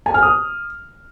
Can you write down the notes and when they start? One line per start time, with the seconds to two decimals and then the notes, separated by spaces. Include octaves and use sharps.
0.06 G#5
0.14 F6
0.23 D#6